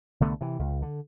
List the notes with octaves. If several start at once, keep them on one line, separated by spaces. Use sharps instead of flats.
C2 D3 A3 B3
C3 E3
C#2
D3